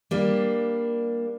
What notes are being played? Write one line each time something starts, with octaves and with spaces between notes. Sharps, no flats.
G3 A#3 D4